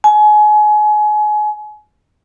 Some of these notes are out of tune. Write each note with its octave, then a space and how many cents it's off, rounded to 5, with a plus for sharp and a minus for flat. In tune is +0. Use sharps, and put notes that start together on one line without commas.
G#5 +30